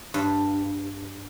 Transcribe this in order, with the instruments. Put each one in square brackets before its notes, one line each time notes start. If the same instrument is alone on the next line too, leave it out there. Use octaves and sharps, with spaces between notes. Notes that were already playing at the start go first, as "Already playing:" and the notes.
[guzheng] G2